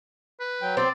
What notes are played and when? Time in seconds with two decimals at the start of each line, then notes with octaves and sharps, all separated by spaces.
0.40 B4
0.62 F#3 G5
0.77 C4 D5